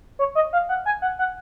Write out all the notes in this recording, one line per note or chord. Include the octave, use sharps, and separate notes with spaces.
C#5
D#5
F5
F#5
G#5
F#5
F#5